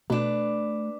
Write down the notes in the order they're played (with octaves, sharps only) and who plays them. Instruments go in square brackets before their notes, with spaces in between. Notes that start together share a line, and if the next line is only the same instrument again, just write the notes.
[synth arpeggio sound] B2 [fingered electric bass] A3 [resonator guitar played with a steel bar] D4 B4